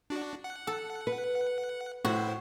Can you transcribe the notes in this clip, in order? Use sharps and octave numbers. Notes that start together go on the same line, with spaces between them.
D4 F#4
F#5
A4
B4
A2 E4 F#4 C5